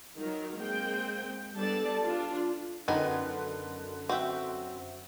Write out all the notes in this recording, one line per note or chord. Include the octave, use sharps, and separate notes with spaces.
D#3 F#3 A#4
G#3 A#3 C4 G5
G3 B3 D4 A4 D5 A5
D4 F4
F#2 D3 D#3 B3 G#5
C4 F#4 E5 G5